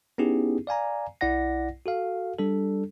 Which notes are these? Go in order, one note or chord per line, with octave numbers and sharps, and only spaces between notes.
B3 C#4 D#4 E4 G4 G#4
D5 F5 G#5 A#5
B1 E4 D5 F#5 A#6
F#4 A4 F5
G3 D4 A4